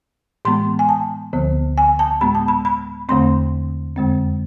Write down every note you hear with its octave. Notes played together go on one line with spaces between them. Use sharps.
A2 E3 G#3 B3 C6
G#5
A5
D2 D3 F3 B3
G#5
A5
A2 G#3 B3 B5
A5
B5
B5
E2 D3 A3 C4 C6
F2 D3 G#3 C4